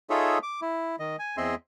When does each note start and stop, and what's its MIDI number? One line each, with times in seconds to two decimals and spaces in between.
0.10 0.38 63
0.10 0.38 65
0.10 0.38 68
0.10 0.38 69
0.10 0.38 73
0.10 0.38 76
0.43 0.60 86
0.62 0.96 64
0.99 1.16 51
0.99 1.16 75
1.19 1.36 80
1.37 1.55 40
1.37 1.55 60
1.37 1.55 68
1.37 1.55 75
1.37 1.55 76
1.37 1.55 84